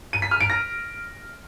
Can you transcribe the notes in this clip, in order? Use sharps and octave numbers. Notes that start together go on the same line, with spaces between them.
D#7
B6
F6
D7
A#6